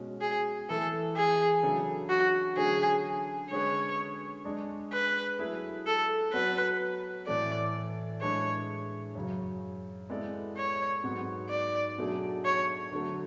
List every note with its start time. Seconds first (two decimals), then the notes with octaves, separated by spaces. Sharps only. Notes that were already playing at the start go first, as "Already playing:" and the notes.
Already playing: B2 G#3 C#4 F#4
0.21 G#4
0.69 E3 A3 E4 A4 B4
1.16 G#4
1.63 C#3 F#3 A3 D4 A4
2.09 F#4
2.57 D3 F#3 A3 C#4 G#4
3.51 D3 G#3 C#4 G#4 B4 C#5
4.45 G#3 D4 G#4 D5
4.93 B4
5.39 F#3 A3 E4 G#4
5.87 A4
6.33 F#3 B3 F#4 B4 C#5
7.27 A2 E3 A3 D5
8.21 A2 G#3 D4 G#4 B4 C#5
9.15 F#2 C#3 F#3
10.10 G#3 B3 E4 A4 D5
10.57 C#5
11.04 G#2 F#3 B3 F#4
11.50 D5
11.98 B2 F#3 A3 D4 G#4
12.45 C#5
12.92 D3 F#3 A3